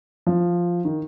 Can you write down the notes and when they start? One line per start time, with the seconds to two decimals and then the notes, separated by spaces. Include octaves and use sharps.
0.27 F3
0.85 D#3